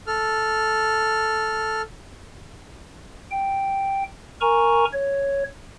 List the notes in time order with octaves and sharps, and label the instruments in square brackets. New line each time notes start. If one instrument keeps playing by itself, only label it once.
[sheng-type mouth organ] A4 F6
[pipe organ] G5
A#4 G#5 A#5 C#6
C#5